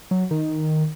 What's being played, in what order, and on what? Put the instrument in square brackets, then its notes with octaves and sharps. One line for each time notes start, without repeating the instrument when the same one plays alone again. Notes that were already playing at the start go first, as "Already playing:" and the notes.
[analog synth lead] F#3
D#3